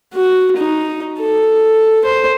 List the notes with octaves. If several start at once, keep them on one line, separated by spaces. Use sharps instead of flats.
F#4
D#4
A4
C5